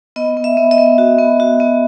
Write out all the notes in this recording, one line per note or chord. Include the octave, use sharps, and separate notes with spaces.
B3 D#5
B3
E5
B3
D#5
B3
F#4
B3
F#4
B3